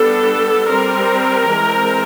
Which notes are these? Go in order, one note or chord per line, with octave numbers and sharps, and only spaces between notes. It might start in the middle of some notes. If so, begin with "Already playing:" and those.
Already playing: G3 B3 D4 A4
G3 C4 A#4
E3 G#3 C4